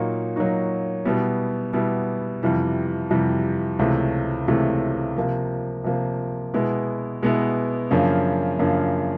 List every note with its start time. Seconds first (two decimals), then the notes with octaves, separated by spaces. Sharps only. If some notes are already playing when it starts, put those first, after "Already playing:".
Already playing: A#2 F#3 A#3 D#4 F#4
0.36 A#2 F#3 A#3 D#4 F#4
1.05 B2 G3 B3 E4
1.73 B2 G3 B3 E4
2.43 F2 C3 E3 G3
3.11 F2 C3 E3 G3
3.79 C#2 C3 E3 A3
4.48 C#2 C3 E3 A3
5.17 C3 F3 A#3
5.84 C3 F3 A#3
6.54 B2 G#3 B3 E4
7.23 B2 G#3 B3 E4
7.91 F#2 C#3 F3 A#3 D4
8.59 F#2 C#3 F3 A#3 D4